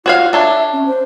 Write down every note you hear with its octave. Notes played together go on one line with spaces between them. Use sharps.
F4 F#4 C#5 F5
D4 A4 C#5 E5
C#4
C5